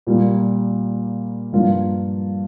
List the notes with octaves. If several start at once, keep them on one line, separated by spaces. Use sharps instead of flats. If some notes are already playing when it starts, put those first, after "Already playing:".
A#2 G3 A#3
G2 F3 A#3 F4